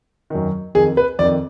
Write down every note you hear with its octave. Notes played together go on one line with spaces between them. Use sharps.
F#2 D#3
F2 D#3 G#4
B4
F2 D#3 D5